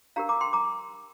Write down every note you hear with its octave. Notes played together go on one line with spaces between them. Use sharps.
D4 G4 A#4 F5 A#5
A#5 D6
G5 C6
A#5 D6